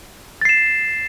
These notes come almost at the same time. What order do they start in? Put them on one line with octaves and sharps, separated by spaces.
A6 C7 E7